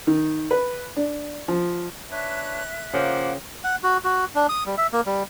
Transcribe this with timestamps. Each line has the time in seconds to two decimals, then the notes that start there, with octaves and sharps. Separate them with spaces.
0.07 D#3
0.51 B4
0.97 D4
1.48 F3
2.11 D4 B4 C#5 E5 F#6
2.93 C#3 F3 A#3 A#4 F#5 G5 D6
3.64 F#5
3.83 F#4
4.04 F#4
4.35 D4
4.49 D#6
4.66 G3
4.78 E5
4.92 A#3
5.06 G3